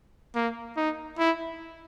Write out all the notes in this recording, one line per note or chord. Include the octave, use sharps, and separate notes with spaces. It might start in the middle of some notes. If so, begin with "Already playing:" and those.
A#3
D#4
E4